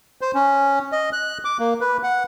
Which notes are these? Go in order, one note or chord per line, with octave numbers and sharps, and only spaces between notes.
C5
C#4
D#5
F#6
D6
A#3
B4
F#5